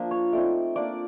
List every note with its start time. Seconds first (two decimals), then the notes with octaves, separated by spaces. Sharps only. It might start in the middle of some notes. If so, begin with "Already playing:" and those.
Already playing: F3 A#3 D4
0.11 C#5
0.33 A3 C4 D#4 D5
0.76 A#3 D4 F4 D5